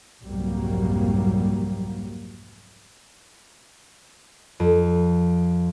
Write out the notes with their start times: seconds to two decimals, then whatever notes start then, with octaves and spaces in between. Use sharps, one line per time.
0.24 C2 F2 G#2 F#3 G3 A#3
4.60 F2